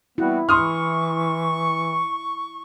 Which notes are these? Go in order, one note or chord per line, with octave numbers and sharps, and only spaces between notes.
G3 B3 C4 E4 F#4
E3 C6 C#6 D#6 F6